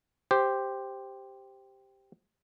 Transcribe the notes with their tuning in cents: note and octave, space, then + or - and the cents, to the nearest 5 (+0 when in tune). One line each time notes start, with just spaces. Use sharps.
G4 +0 C5 +0